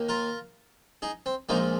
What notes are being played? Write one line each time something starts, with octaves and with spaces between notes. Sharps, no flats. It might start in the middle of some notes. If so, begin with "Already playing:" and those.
Already playing: D#2 D#3 A#3
F4 A#4
D#4 G#4
C4
A#1 A#2 F3 G#3 A#3 D#4